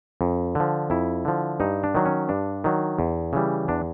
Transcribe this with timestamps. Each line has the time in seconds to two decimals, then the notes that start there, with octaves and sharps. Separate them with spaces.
0.21 F2
0.55 D3 F3
0.90 F2 E4
1.25 D3 F3
1.60 G2 D#4
1.84 D4
1.95 D#3 F#3
2.06 C#4
2.29 G2 D4
2.64 D#3 F#3
2.99 E2
3.33 C#3 E3 G3
3.68 E2 D4